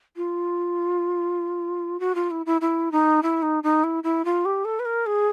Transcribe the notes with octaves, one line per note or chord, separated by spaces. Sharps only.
F4
F#4
F4
E4
E4
E4
D#4
E4
D#4
D#4
E4
E4
F4
G4
A4
B4
A#4
G#4